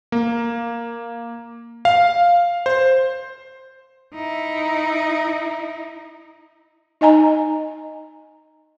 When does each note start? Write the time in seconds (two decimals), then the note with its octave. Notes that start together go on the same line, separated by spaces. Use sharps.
0.12 A#3
1.85 F5
2.66 C5
4.14 D#4 E4
7.01 D#4 D#5 G#5 A#5